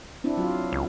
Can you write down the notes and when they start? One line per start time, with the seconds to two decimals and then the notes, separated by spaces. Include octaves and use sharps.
0.24 C4 D4 E4
0.37 F#3 F4
0.73 C#2